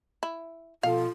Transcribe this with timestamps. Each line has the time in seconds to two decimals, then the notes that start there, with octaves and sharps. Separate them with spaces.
0.23 E4
0.83 B2 F3 F4 A4 F5